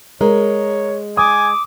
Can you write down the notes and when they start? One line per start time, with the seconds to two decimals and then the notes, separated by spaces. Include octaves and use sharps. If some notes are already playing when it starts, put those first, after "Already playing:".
0.21 G#3 A#4 C#5
1.17 G#5 D6 D#6